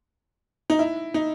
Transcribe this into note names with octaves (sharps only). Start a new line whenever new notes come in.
D#4
E4
D#4